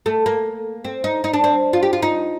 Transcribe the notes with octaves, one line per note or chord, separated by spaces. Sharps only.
A3
A#3
C4
D#4
D#4
D4
C4
F4
G4
F4
D#4